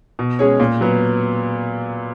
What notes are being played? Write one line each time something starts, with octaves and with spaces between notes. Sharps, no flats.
B2
G#3 C#4 G#4 C#5
A#2
F#3 B3